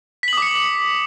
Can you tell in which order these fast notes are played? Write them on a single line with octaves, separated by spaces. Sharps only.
B6 F#7 D#6 D6 C#7